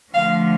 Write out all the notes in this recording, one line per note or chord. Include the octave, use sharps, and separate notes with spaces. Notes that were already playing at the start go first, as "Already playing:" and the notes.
D3 F3 A3 F5